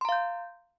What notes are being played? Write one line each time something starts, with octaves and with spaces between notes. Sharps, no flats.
F5 A#5 C6 G6